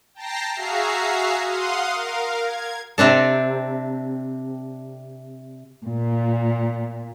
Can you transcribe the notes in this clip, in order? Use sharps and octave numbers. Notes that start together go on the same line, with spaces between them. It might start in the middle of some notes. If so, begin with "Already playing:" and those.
G5 A5 A#5 A#6 C7
F#4 G#4 E5 F5 A#5 C7
F5 F#5 C6 D#6
A#4 F5
G#6
C3 C4 D4 A4
A#2